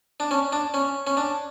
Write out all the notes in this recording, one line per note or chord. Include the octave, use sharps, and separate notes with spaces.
D4
C#4
D4
C#4
C#4
D4